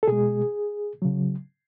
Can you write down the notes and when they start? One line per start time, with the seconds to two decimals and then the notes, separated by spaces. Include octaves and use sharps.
0.03 A4
0.07 B2 G#3 G#4
1.02 C#3 F#3